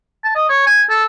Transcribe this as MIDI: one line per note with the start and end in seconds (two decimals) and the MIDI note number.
0.24 0.34 81
0.36 0.48 75
0.49 0.64 73
0.67 0.82 80
0.90 1.04 69